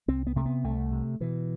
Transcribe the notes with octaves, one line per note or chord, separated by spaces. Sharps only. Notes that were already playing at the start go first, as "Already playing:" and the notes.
C2 C4
B3
C3 A3
B3
C2 A3
C3
B2 E3